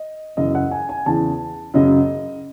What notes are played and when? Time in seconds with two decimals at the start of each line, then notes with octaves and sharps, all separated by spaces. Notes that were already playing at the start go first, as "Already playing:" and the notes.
Already playing: D#5
0.37 F#2 C#3 E3 D#5
0.55 F#5
0.71 G#5
0.89 G#5
1.06 E2 C#3 E3 A5
1.74 F#2 C#3 F#3 D#5